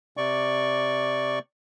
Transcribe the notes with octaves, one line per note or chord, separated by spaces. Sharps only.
C3 D5 C#6